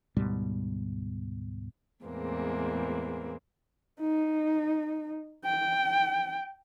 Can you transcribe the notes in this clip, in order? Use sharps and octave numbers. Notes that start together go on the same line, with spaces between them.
D2 G#2 B2 G3
E2 A2 G#3 A#3 C4
D#4
G5